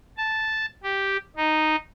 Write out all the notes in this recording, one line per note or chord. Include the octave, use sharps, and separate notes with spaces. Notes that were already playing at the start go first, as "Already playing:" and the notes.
A5
G4
D#4